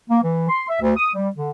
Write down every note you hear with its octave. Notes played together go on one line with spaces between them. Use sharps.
A#3
E3
C6
E5
D2
D#6
G3
D3